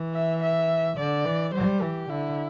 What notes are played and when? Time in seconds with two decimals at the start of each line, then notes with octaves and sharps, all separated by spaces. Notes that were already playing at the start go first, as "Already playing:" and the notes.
Already playing: E3
0.14 E5
0.42 E5
0.98 D3 D5
1.25 E3
1.53 G3 C5
1.82 E3 G4
2.10 D3 E4